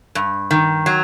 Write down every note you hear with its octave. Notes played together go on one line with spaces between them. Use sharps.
G2
D#3
F#3